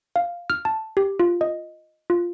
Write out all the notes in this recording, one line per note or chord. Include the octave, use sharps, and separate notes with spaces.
F5
F6
A5
G4
F4
D#5
F4